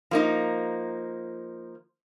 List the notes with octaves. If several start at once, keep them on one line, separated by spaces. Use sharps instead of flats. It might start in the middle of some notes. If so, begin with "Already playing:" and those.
F3 A#3 D#4